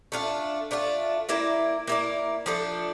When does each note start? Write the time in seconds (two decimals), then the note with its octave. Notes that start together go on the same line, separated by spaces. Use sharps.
0.12 A3 D4 F4
0.71 A3 D4 F4
1.29 A#3 E4 A#4 D5
1.87 A#3 E4 A#4 D5
2.46 F3 A3 D4 A4